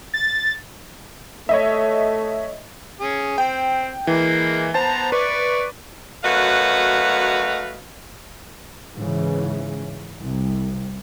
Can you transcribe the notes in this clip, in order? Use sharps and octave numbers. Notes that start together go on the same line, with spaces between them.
A6
A3 C#5 D#5 E5
C#4 G#4
C4 G5
E3 G#3 A#3
B3 C5 A5 A#5 A6
B4 D5 C#6 D6
F#2 A3 F#4 B4 D#5 F5
G#2 C#3 E3
C2